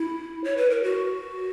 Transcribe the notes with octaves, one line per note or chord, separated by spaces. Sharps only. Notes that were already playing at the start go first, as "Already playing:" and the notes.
Already playing: E4
C#5
B4
A#4
F#4